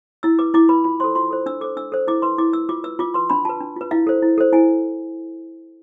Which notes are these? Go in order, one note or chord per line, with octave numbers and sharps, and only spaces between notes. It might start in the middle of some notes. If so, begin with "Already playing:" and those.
E4 E6
B4 D6
E4 D6
B4 B5
F4 B5
A4 C5 C6
F4 C6
A4 C5
D4 E6
A4 C5 D6
D4 E6
A4 C5
E4 D6
B4 C6
E4 D6
B4 E6
F4 D6
B4 E6
F4 D6
B4 C6
D4 B5
F4 B4 A5
D4
F4 B4
E4 F5
A4 C5
E4
A4 C5
E4 G#5